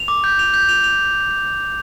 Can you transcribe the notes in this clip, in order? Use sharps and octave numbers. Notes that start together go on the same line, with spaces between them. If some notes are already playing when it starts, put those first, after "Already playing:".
Already playing: F7
D6
G6
F7
G6
F7
F7